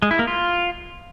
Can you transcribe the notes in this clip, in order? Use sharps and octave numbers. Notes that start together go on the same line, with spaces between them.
G#3
E4
A#3
F4